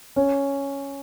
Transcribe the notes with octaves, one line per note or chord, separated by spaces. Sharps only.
C#4